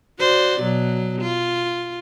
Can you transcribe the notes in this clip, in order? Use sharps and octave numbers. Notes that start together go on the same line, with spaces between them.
F#4 C5 D5
B2 F#3
F4